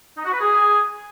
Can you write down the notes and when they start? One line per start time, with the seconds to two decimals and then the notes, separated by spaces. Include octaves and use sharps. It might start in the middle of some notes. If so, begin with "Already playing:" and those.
0.17 D#4
0.25 F#4
0.32 B4
0.40 G#4